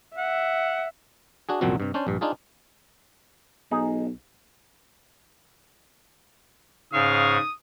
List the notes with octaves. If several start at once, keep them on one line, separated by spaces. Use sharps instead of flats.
E5 F#5
D4 F#4 G#4
C2 F#2 A#2 F3 C4 F#4
G2 C3
C#4 D4 C5 D5
A#1 G2
D4 D#4 F4 G#4
B1 D#4 G#4
G#2 C#3 F5 C#6 D#6